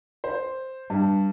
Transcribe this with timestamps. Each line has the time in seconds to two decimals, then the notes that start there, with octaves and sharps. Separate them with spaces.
0.24 C5
0.90 G2